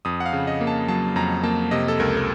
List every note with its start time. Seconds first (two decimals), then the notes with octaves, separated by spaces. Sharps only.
0.05 F2 D#6
0.20 F#5
0.26 F5
0.33 C#3
0.47 D#5
0.61 A#3
0.67 A5
0.88 F#3 A5
1.16 F2 A#5
1.43 A#3 A5
1.71 C3 D#5
1.88 A4
2.00 C#2 A#4
2.17 A#4